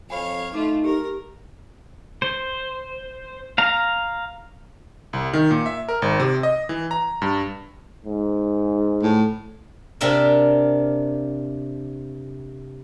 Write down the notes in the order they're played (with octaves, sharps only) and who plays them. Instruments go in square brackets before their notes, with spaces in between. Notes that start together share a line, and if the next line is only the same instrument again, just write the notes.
[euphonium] F2 [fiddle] C#5 F5 [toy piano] G#5 B5
[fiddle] A3 F4 [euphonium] D#4 [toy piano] D6
[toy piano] G4 [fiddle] A#4
[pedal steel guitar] C5
F5 A#5
[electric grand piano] C2
D#3
A#2
E5
A#4
G#1
C3
D#5
E3
A#5
G2
[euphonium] G#2
[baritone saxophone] A2
[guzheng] C3 D4 F4 A#4 E5